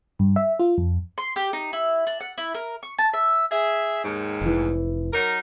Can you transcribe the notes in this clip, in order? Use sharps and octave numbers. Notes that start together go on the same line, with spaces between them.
G2
E5
F4
F2
C6
G4
D#4
E4
D4
F#5
E4
A#4
C#6
A5
E5
G#4 E5
D#2 G#2
F1 E3
F#3 D#4 A#4